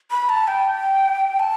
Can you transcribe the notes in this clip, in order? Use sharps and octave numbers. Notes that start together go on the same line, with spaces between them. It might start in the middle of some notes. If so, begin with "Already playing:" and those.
B5
A5
G5
A5